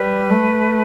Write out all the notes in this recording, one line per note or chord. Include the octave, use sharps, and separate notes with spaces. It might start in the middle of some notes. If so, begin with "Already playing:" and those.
Already playing: G3 B4
A3